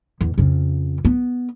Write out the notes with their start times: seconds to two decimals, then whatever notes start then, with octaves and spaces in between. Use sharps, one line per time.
0.21 E2
0.38 F2 C#3
1.05 B3